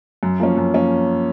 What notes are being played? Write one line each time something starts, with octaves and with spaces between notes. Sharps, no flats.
F#2
F3 A#3 C#4
F#2
F3 A#3 C#4